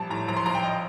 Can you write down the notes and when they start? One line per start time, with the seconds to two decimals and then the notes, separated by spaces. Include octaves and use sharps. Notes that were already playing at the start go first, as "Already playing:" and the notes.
Already playing: A#1 G3 A5
0.10 A2 A#5
0.28 A#1 A#5
0.37 C6
0.46 A#1 A#5
0.55 G5
0.64 D#5